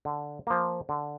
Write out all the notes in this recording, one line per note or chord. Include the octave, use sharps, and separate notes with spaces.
D3
F3 A#3
D3